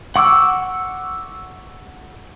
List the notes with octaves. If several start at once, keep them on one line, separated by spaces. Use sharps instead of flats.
F#5 C#6 D6 E6